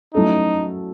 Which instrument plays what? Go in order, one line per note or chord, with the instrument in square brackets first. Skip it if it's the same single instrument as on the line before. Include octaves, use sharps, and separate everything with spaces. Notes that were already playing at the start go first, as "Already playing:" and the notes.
[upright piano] F#3 A3 C#4 E4 A4 [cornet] D#4